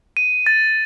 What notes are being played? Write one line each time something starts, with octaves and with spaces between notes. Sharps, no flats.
D#7
A6